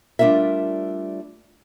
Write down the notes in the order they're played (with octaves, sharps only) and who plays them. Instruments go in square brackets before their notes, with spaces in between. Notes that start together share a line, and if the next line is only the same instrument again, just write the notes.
[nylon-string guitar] G3 A3 D4 F4 A#4 E5